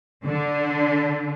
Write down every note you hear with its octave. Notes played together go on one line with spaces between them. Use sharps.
D3